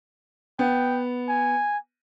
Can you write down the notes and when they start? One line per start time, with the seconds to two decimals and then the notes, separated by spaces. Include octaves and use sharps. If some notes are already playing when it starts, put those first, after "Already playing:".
0.59 B3 G5
1.28 G#5